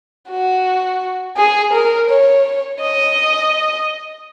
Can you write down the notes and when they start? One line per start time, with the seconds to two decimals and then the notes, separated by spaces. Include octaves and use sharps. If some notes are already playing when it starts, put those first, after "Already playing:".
0.29 F#4
1.37 G#4
1.73 A#4
2.10 C#5
2.80 D#5